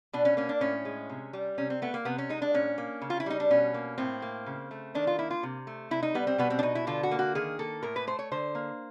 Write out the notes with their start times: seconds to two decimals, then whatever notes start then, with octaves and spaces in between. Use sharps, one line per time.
0.13 B2 D4
0.25 C#4
0.37 A#3 C#4
0.49 D4
0.61 A2 C#4
0.85 G#3
1.10 C3
1.33 G3
1.58 C3 C#4
1.70 C4
1.82 A3 B3
1.94 A#3
2.05 C3 B3
2.18 C#4
2.29 G#3 D#4
2.42 D4
2.54 A#2 C#4
2.78 A#3
3.02 C#3
3.10 F4
3.20 E4
3.26 G3 D#4
3.40 D4
3.51 B2 C#4
3.74 A#3
3.98 A2 C4
4.22 A#3
4.46 C#3
4.71 A3
4.95 D#3 D4
5.07 F4
5.18 A#3 E4
5.31 F4
5.43 C3
5.67 A3
5.91 C3 E4
6.03 D#4
6.14 G3 B3
6.27 C4
6.38 B2 B3
6.50 C4
6.59 D4
6.63 B2 D#4
6.75 E4
6.87 D3 F4
7.03 F#4
7.11 A#3
7.19 F#4
7.35 D#3 G#4
7.59 A#3 A4
7.83 A2 A#4
7.96 B4
8.07 A3 C5
8.19 C#5
8.32 D3 C5
8.55 A#3